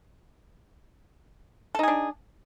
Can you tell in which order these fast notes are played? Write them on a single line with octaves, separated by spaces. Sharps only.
A4 D#4 G#4 D4